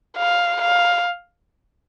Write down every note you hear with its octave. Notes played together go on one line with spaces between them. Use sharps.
F5
F5